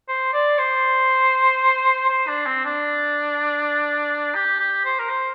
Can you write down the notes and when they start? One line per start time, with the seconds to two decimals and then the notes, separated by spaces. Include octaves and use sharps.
0.08 C5
0.33 D5
0.58 C5
2.09 C5
2.28 D4
2.46 C4
2.65 D4
4.35 G4
4.60 G4
4.85 C5
5.00 A#4
5.09 C5